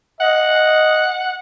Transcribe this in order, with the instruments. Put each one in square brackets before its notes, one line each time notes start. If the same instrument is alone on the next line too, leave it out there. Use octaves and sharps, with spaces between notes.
[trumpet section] D#5 [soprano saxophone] F#5